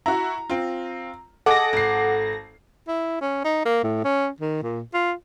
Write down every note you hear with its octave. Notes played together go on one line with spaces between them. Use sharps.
E4 F#4 A#5
C4 F4
G#4 A4 D#5 F#5 D6 A#6
G#1 C7
E4
C#4
D#4
A#3
A2
C#4
D#3
A#2
F4